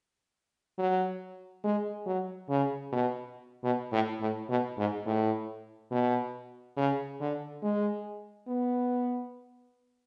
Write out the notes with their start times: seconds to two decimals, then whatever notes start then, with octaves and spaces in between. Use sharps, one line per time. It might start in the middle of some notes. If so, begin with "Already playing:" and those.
0.78 F#3
1.64 G#3
2.06 F#3
2.49 C#3
2.92 B2
3.63 B2
3.92 A2
4.21 A2
4.49 B2
4.78 G#2
5.06 A2
5.91 B2
6.77 C#3
7.20 D3
7.62 G#3
8.48 B3